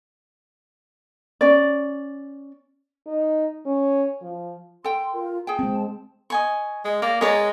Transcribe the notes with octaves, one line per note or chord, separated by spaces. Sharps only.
C#4 D5
D#4
C#4
F3
A4 G5 C6
F4 A#4
G#4 G5 A5
G#3 C4
D#5 G#5 C#6
G#3
A#3 D5
G#3 A#4 C#5 A5